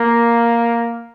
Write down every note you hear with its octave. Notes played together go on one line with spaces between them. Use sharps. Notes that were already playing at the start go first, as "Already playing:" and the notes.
Already playing: A#3